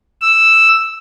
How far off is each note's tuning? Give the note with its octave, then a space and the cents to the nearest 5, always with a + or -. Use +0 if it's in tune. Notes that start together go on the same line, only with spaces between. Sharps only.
E6 +0